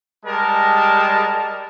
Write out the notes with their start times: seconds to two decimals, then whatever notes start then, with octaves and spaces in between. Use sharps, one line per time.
0.24 G3 G#3 A#4 A5